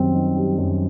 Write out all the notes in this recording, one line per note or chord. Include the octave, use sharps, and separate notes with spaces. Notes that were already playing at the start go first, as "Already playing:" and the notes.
Already playing: F#2 D#3 G3 C4
D#3
G3
F#2